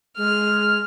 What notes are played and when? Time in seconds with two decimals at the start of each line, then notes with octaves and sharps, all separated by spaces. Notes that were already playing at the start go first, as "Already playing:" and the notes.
0.17 G#3 F6